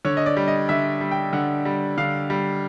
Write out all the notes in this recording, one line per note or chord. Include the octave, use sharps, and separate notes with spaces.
D3 C#5
D#5
D5
G3
D#5
D3 E5
G3
G5
D3 F#5
G3
D3 F5
G3